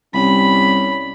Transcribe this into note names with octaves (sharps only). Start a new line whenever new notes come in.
C2 G3 C#4 B5